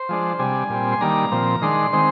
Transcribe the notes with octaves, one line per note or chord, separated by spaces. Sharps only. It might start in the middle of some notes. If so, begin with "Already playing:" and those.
Already playing: C5
F3 G#3 D4
C3 G3 D4 G#5
A#2 G3 C4
C6
D#3 G3 A#3 D4 A#5
A#2 F3 C4
D#3 G#3 D4 C6
D#3 G#3 C4